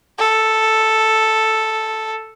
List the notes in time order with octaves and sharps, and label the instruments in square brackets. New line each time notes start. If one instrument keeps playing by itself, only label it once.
[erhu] A4